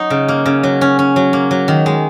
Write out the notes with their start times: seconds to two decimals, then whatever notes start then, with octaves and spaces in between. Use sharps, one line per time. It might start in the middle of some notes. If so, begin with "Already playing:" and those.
Already playing: F#3 D#4
0.10 C#3
0.28 A#3
0.46 C#3
0.63 F#3
0.81 C#4
0.99 C#4
1.16 F#3
1.33 A#3
1.51 F#3
1.68 D#3
1.86 G#3